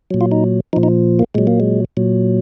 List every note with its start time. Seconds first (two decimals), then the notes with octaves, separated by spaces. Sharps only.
0.11 A#2 F#3
0.21 F4
0.32 D#4
0.73 F3 D#4
0.76 A#2
0.83 D#4
1.19 A#3
1.34 A#2 F#3 G#3
1.47 A#3
1.60 G#3
1.97 A#2 F#3